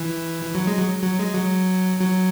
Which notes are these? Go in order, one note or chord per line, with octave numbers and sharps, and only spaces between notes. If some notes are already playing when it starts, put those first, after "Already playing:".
Already playing: E3
E3
F#3
G#3
F#3
F#3
G#3
F#3
F#3